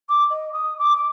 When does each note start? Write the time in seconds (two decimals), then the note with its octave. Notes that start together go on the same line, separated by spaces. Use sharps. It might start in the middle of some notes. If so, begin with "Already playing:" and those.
0.08 D6
0.30 D#5
0.53 D#6
0.78 D6
0.96 D6